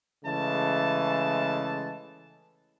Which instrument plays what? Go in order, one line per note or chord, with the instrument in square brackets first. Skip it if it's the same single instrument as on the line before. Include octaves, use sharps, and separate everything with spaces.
[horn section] C#3 E3 G#3 A3 A5